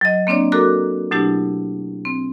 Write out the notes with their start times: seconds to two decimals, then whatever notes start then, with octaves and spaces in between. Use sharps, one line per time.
0.01 F#3 D#5
0.27 A#3 C4 D4 C#5 D5
0.52 F#4 A4 A#4 A#5 D6 F#6
1.11 B2 F#3 A3 D4 E4 G4
2.05 C4